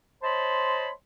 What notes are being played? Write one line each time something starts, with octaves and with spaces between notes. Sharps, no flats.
C5 C#5 D#5 A5 B5 C6